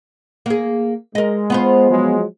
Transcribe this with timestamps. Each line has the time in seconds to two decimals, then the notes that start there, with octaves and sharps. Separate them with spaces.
0.46 A#3 G#4
1.15 G#3 A#4 D#5
1.50 B3 F4 C5
1.89 F3 F#3 G#3